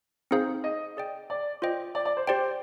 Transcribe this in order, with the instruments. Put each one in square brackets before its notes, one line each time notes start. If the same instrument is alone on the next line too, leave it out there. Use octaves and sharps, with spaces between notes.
[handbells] C4 D#4 G#4 C5 F5
[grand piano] D#5
[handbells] G#4 D5 G5
[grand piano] D5
[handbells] F4 C5 D#5 G5
[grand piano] D5
D5
C5
[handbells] G4 D5 G5 [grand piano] C5